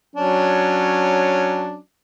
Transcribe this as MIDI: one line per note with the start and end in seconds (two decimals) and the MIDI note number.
0.16 1.78 54
0.16 1.78 61
0.16 1.78 62